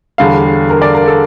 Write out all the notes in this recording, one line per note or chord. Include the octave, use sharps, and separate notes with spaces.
E1 E2 D3 G3 F5
A#4
D5
A#4
A4